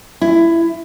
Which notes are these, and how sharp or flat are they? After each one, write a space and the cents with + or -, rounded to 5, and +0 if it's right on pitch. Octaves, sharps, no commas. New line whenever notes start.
E4 +15